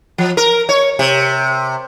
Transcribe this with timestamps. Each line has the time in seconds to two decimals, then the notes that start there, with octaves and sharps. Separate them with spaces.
0.18 F3
0.37 A#4
0.69 C#5
0.99 C3